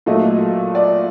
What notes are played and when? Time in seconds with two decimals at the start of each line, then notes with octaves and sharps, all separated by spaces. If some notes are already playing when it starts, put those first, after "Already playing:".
0.06 A#2 F#3 A3 D#5
0.75 D5